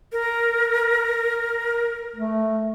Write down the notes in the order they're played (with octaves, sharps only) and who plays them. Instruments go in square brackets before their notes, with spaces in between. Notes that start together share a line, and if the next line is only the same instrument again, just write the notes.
[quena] A#4
[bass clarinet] A3